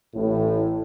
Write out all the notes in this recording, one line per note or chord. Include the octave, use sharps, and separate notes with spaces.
A1 A2